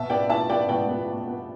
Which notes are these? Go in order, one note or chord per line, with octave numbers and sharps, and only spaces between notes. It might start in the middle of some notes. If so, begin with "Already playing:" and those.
Already playing: B2 E5 A5
B3 D5 G5
B2 E5 A5
B3 D5 G5
B2 D5 G5
B3
B2
B3